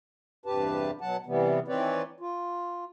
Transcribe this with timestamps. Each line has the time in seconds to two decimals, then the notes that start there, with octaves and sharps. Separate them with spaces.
0.46 E2 G2 C3 G4 B4 A5
1.01 B2 F#3 F#5 A5
1.26 C3 E3 G3 B3
1.68 D#3 E3 C4 B4 C#5 D5
2.20 F4